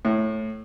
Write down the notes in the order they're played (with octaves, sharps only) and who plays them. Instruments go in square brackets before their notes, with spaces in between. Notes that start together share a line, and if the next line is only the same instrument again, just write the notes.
[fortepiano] A2